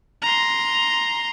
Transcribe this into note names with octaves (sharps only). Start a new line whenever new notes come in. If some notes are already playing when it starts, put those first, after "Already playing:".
A#5 C6